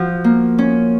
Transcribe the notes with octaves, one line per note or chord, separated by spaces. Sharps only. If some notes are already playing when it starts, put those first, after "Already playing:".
Already playing: F3 F#4
A#3
C#4